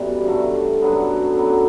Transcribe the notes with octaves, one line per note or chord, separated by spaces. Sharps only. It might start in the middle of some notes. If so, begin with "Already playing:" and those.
Already playing: F#2 B2 E3 G3 A3
G2 D3 F#3 A3
F#2 D3 F#3 B3
F#2 F#3 B3